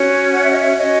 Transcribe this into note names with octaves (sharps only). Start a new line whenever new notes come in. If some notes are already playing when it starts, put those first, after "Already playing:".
Already playing: C#4 F#4 C#5
F#5
E5
D#5
E5
C#4 F#4 C#5 D#5